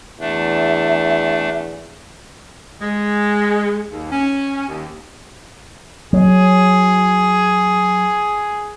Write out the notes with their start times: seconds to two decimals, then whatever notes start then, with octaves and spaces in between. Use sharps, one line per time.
0.20 E2 A3 D4 E5
2.81 G#3
3.92 D#2
4.12 C#4
4.69 D#2
6.13 F#3 G#4